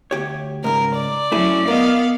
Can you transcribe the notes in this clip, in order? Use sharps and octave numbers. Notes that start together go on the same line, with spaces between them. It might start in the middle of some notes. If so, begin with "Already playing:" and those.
D2 G4 C#5
C#2 G#2 A#4
D5
F#3 A3 C#4 E4 G#4
B3 A#4 D#5 F5